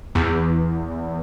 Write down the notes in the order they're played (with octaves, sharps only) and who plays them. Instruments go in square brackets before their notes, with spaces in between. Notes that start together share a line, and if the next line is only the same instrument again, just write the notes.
[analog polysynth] E2